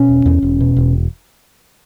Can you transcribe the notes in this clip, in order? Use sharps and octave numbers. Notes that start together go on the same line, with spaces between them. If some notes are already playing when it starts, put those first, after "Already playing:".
Already playing: B2 C#4
E1
E2
E1
B2
E1